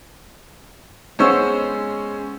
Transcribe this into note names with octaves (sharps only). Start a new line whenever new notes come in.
G#3 B3 C#4 C5 C#6 E6